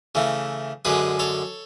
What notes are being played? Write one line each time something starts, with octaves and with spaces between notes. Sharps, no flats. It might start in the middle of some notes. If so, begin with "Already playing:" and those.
C#3 E3 A3
F#2 D3 G#3 G#4 B4
A4 C#5